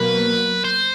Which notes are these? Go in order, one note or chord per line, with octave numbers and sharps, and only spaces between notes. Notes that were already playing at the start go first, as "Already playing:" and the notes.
Already playing: B2 F#3 A#3 B4
C5